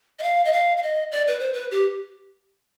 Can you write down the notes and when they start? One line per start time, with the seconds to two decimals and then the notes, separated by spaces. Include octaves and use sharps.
0.19 D#5
0.23 F5
0.45 D#5
0.53 F5
0.77 F5
0.82 D#5
1.12 D5
1.27 B4
1.40 C5
1.53 B4
1.71 G4